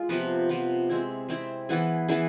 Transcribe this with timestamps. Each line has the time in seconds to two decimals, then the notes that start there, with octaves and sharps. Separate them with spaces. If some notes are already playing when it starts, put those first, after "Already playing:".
Already playing: G#3 F4
0.09 C3 F3 B3
0.49 C3 F3 B3
0.89 G#3 C4 E4
1.29 G#3 C4 E4
1.69 E3 B3 E4 G#4
2.08 E3 B3 E4 G#4